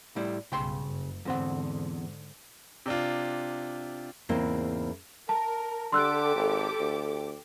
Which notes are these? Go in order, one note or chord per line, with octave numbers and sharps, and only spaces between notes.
A2 G3 E4
B1 G2 C#3 G5 C6
F#1
E2 G#2 D3 C4 F#5
C3 D4 F4
E2 G#2 C#3 A#3 C4 E4
A#4 A5
D3 G4 A4 C6 D6 E6 F#6
G#1
D2